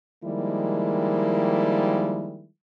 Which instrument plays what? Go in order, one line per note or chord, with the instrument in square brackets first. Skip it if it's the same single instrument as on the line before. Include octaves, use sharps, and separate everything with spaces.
[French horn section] D#3 F3 G3 G#3 A#3 E4